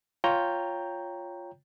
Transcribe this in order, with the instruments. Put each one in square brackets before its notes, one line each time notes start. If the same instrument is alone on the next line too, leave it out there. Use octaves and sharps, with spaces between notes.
[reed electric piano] F4 C#5 G5 A#5 G6